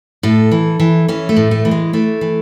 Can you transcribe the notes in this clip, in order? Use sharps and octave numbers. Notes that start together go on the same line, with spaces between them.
A2 A4
E3
E3
E3 C#4
A3
A2
A3
E3
G#3
E3 A3
E3